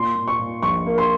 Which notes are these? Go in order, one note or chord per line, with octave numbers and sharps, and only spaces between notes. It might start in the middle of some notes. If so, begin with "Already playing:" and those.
Already playing: A#2 C6
A#2
C#6
A#2
A#1 C#6
A#3
C6